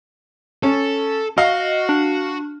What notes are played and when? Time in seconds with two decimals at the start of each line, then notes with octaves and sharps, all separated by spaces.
0.63 C#4 A4
1.38 F#4 D#5 F5
1.89 D4